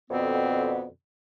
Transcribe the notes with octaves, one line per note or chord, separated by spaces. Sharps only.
F2 B2 D3 B3 C4